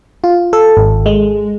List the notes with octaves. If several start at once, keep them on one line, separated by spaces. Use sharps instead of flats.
F4
A4
G#1
G#3